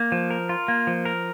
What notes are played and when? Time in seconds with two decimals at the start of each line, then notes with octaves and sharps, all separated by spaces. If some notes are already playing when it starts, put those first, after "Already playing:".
Already playing: A#3
0.12 F3
0.31 A#4
0.49 F4
0.68 A#3
0.87 F3
1.05 A#4